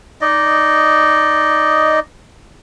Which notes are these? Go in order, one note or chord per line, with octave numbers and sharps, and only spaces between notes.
D#4 D5 D#5